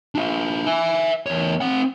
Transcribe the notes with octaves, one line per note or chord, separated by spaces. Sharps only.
D4 F4
E5 G#5
E2 C#5
C4 F#5